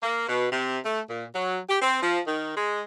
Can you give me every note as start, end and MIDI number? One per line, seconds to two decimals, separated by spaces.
0.03 0.25 58
0.29 0.47 47
0.52 0.79 48
0.85 1.01 57
1.09 1.26 46
1.35 1.59 54
1.69 1.78 67
1.82 1.97 60
2.03 2.20 53
2.27 2.55 51
2.57 2.83 56